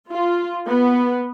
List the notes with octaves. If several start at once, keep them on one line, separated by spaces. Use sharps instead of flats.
F4
B3